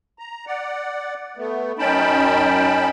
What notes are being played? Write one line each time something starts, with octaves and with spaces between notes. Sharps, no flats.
A#5
D5 F#5
A3 B3
F#2 C#4 D#4 G5 A5 B5